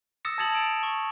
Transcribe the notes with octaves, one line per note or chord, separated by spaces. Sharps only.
D#6 E6 A6 A#6 C#7 E7
A5 G#6 A6 C#7 F7 F#7
D7 E7
C#6